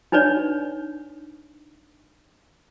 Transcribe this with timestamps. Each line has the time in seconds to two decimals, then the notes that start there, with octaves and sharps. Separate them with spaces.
0.12 D4 D#4 B4 C#5 D5